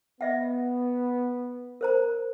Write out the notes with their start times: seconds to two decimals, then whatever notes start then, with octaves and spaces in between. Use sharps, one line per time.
0.21 B3 D#5 E5 F#5
1.81 A#4 C5 A#5